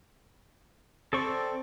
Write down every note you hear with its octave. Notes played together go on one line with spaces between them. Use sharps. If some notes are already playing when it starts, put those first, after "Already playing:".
C4 A4 D5 C#6